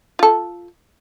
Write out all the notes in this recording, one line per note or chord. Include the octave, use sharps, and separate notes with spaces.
F4 A4